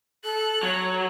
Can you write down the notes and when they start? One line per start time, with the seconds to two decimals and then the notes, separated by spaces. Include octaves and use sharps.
0.25 A4 F#6
0.63 F#3 C#5